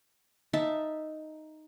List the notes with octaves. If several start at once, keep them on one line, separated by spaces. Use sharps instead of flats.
D#4 E5 A5